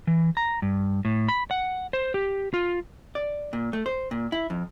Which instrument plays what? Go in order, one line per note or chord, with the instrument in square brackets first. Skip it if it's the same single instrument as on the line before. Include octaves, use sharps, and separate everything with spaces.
[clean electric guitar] E3
A#5
G2
A2
B5
F#5
C5
G4
F4
[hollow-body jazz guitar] D5
A#2
A3
C5
A#2
E4
F2